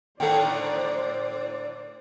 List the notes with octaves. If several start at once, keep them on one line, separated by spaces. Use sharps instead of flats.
A2 D3 D#3 A4 C5 D5 F#5 G5